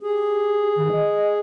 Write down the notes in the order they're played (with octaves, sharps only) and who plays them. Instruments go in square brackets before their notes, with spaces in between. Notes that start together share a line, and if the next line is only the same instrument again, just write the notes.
[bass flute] G4 [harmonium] G#4
[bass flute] D#3
D#5